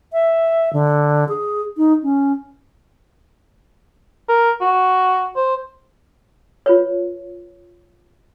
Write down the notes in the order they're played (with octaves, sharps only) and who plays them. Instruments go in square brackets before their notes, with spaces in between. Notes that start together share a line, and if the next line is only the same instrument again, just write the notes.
[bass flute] E5
D3
G#4
D#4
C#4
[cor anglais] A#4
F#4
C5
[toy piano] F4 B4 C#5